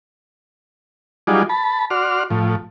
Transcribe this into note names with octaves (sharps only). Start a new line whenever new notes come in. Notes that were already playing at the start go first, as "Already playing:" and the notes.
F#3 G3 D#4 F4 G#4 D5
A5 B5
F#4 D5 C6 F6
A2 F3